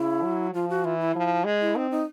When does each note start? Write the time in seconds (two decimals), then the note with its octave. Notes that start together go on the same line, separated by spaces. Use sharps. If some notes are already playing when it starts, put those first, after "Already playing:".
Already playing: C#3 E4
0.23 F#3
0.54 F3 F4
0.70 F#4
0.85 E3 F4
0.99 E4
1.15 F3
1.45 G#3
1.61 E4
1.76 C4 D#4
1.91 D#4